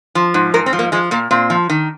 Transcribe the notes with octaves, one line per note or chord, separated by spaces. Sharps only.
F3
G#2
G#2 A#4
C4
F3
A#3
F3 G#3
A#2 A#3
A#2 C4
F3
D#3